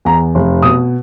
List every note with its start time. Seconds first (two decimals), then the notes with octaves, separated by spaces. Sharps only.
0.05 E2 A#5
0.35 F1
0.62 B2 D#6